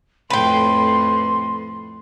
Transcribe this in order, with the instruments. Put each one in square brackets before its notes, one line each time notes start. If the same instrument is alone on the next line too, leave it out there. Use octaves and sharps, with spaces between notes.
[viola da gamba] F2 A2 [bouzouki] B4 G5 [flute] C6